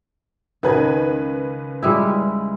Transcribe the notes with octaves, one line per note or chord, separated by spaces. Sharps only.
C#2 D#3 B4 G#6
G3 G#3 E4